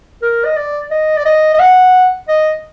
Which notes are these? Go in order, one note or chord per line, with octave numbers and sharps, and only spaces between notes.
A#4
D#5
D5
D#5
D5
D#5
D#5
F#5
D#5